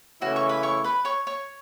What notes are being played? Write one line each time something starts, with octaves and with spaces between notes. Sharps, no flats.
C#3 E3 A3 C#4 E4 F#4 F#5
C#5 C#6
B4 B5
C#5 C#6
B4 B5
C#5 C#6
C#5 C#6